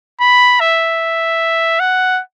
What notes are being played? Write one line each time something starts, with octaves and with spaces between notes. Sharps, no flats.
B5
E5
F#5